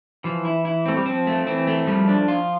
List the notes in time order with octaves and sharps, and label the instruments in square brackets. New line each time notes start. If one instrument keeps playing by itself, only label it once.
[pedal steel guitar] E3 [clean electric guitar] F3
[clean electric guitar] E4
E4
[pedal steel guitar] A3 [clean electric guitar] C4
[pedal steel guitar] G3
[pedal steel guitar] F3 [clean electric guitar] C4
[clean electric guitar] A3
[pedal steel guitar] E3 [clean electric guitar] C4
[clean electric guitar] A3
[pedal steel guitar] F3 [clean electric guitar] G3
[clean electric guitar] D4
F4